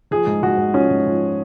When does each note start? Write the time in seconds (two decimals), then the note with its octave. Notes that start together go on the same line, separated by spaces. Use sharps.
0.11 F3 G#4
0.27 G#2
0.43 G#2 F#4
0.58 G#2
0.74 F3 C#4
0.90 G#2
1.06 F3